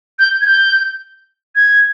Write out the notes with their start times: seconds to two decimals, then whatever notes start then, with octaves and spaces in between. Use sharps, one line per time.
0.19 G6
0.41 G#6
0.46 G6
1.55 G#6